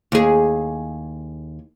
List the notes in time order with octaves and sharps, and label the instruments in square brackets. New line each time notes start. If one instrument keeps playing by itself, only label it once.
[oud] D#2 G#4